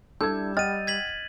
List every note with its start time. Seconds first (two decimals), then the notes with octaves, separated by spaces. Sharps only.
0.21 G3 D4 E4 A4 E6 G6 G#6
0.57 D#5 F#5 G5 F6 A6 D#7
0.87 G#6 B6 F#7